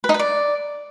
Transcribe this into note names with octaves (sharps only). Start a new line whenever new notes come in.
B4
D#4
B4
D5